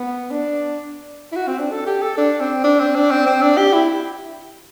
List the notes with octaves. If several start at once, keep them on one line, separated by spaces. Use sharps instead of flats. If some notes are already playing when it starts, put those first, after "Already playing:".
Already playing: B3
D4
E4
F#4
C4
D4
A4
G4
A4
D4
C4
D4
C4
D4
C4
C4
D4
G4
E4